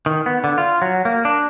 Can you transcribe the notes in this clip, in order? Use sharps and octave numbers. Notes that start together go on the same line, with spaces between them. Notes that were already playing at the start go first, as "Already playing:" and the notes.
D#3
B3
D3
F4
F#3
A#3
D4